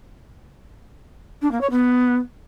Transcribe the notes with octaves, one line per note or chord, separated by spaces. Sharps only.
D4
A#3
C#5
B3